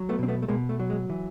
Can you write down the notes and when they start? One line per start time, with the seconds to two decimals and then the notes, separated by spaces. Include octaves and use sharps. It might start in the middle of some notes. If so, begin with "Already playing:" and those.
Already playing: F#3
0.09 A3 B3
0.19 B2 C4
0.28 A3 B3
0.42 A3
0.48 B2 G#3 A#3
0.69 A3
0.79 F#3
0.90 G#3
1.09 E3